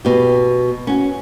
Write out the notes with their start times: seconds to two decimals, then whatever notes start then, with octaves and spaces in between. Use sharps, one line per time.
0.05 B2 G4
0.87 C#4 F#4